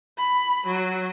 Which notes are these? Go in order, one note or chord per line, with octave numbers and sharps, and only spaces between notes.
B5
F#3